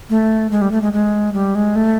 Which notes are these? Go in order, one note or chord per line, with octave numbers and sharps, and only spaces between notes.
A3
G#3
G3
A3
G#3
G#3
G3
G#3
A3